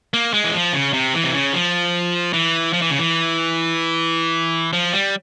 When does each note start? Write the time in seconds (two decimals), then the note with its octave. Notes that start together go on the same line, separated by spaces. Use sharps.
0.14 A#3
0.34 G#3
0.44 E3
0.53 F3
0.73 C#3
0.93 C3
1.14 E3
1.24 C3
1.34 C#3
1.53 F3
2.33 E3
2.73 F3
2.82 E3
2.90 C#3
2.99 E3
4.73 F3
4.93 G3